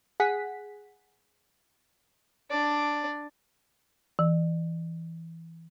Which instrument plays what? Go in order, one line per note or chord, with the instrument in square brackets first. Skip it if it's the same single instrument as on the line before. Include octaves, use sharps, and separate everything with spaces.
[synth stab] G#4 F#5 B6
[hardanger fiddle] D4 D5
[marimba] E3